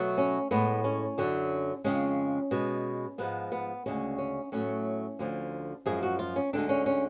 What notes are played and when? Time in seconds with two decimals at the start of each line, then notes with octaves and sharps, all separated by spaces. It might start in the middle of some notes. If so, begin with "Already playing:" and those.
Already playing: B2 F#3 A3
0.18 C#4
0.51 A2 G#3 B3
0.84 C#4
1.18 F#2 D3 F#3
1.84 F2 C#3 G#3 C#4
2.51 B2 G#3
3.18 G#2 F3 G#3 B3
3.52 B3
3.86 D2 C#3 G#3 C#4
4.18 C#4
4.52 A2 F#3 A3 C#4
5.19 D2 D3 F3
5.86 F#2 F3 G#3 G#4
6.03 F#4
6.19 F4
6.36 C#4
6.53 D2 D3 G#3 D4
6.69 C#4
6.86 C#4